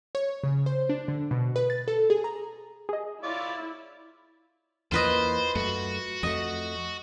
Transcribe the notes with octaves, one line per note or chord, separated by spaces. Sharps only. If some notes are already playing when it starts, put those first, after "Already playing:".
C#5
C#3
C5
D4
D3
B2
B4
A6
A4
G#4
A#5
G#4 D#5
E4 F4 C#5 D5
E2 E3 A#3 F4 B4 C5 D#5
F#2 A3 F#4
F2 A3 D#5